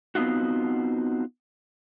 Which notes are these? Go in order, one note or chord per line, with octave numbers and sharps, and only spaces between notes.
B3 C4 D#4 F4 F#4